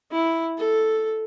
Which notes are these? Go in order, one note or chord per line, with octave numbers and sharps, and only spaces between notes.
E4
A4